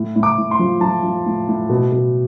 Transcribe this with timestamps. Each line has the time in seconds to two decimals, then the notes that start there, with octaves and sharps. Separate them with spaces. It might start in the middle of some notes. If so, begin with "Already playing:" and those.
Already playing: A2
0.16 A2
0.23 D6
0.38 A2
0.51 C6
0.59 F3
0.81 F3 A5
1.03 F3
1.26 A2
1.48 A2
1.69 B2
1.92 B2